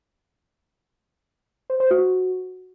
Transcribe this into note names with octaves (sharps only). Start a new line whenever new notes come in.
C5
C5
F#4